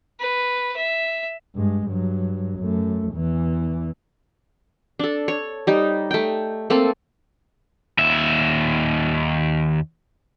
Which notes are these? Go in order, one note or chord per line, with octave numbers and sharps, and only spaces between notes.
B4
E5
G2 G#3
G2 F#3
F#2 A3
E2 E3
D4 A4
C#5
G3 D#4
A3 G5
A3 A#3 C4 A4
D#2 E5